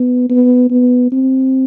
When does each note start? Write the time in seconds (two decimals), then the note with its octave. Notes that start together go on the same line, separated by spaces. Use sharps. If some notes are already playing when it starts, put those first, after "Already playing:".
Already playing: B3
0.30 B3
0.70 B3
1.12 C4